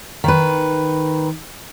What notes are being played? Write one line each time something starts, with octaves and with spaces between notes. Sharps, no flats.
D#3 B4